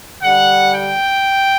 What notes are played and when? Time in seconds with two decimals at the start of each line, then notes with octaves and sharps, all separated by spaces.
0.22 D3 G3 D4 F#5
0.72 G5